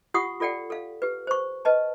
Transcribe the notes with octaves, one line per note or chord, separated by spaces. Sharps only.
F4 G4 F#5 C#6 D#6
F4 A4 D5 F#5 G5
A4 F5
G4 B4
C5 C#6
B4 D#5 A5